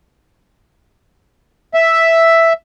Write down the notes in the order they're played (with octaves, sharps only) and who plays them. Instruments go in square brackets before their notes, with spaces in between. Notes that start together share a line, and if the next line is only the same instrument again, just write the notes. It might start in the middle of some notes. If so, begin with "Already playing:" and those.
[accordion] E5